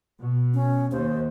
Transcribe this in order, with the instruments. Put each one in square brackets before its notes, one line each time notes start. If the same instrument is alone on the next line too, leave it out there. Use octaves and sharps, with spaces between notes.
[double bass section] B2
[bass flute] C#4
[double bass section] D#2 [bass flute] C5